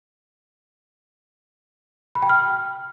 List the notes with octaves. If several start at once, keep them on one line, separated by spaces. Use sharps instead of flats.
B5
G5
F6